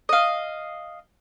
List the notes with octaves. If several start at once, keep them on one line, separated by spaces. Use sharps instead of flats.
D#5 F5